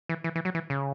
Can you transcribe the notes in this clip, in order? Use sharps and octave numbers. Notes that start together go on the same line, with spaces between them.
E3
E3
E3
F#3
E3
C#3